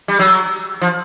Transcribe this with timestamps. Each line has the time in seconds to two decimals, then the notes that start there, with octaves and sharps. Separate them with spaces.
0.08 G3
0.19 F#3
0.81 F3